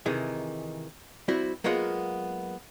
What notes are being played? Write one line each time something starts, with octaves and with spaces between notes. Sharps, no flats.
C3 D#3 E3 D#4 G#4
G3 C4 E4 F#4
F#3 G#3 A#3 B3 F4 F#5